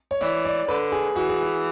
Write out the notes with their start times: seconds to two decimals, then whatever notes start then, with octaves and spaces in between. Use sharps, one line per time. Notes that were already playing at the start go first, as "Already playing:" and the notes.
0.11 C#5
0.21 E3 D5
0.45 D5
0.68 D3 B4
0.92 G#4
1.16 E3 F#4
1.29 G#4
1.43 F#4